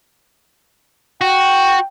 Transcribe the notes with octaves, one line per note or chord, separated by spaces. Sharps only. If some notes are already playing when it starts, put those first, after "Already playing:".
F#4 G5